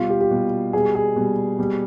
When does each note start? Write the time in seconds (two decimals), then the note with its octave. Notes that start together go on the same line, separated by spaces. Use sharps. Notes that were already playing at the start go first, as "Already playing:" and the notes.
Already playing: B2 G3 F4
0.09 G4
0.21 G4
0.31 B2 G3
0.73 B2 G3 G#4
0.95 G#4
1.16 B2 G3
1.59 B2 G3